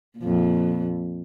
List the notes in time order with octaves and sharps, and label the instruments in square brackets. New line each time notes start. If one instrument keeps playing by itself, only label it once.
[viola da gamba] F2 A#2